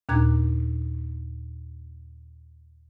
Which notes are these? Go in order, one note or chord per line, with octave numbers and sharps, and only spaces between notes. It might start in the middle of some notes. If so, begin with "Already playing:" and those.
D#2 A#2 D4 A#5 F#6 G#6